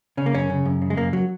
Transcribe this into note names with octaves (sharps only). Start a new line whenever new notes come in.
C#3 C#4
A#3
F#2 C#4
C#3
F#2
C#3
G#3
F#2 A#3
F#3